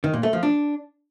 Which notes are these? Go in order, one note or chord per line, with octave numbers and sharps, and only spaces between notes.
D#3
A#2
A3
F3
D4